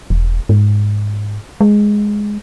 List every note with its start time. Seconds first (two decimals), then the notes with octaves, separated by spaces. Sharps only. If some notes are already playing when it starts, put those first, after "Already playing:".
0.10 E1
0.49 G#2
1.61 G#3